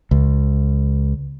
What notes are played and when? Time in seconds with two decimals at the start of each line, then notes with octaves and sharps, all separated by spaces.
0.11 C#2